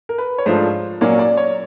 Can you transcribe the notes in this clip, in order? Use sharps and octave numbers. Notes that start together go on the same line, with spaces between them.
A#4
B4
C#5
G#2 F3 A3 D4 F4 C5
A#2 F#3 A#3 C#4 D5
D5
C#5